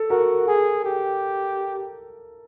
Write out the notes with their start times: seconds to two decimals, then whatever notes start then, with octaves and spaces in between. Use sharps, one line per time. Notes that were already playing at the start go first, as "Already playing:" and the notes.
Already playing: A4
0.10 F#4 A#4
0.48 G#4
0.85 G4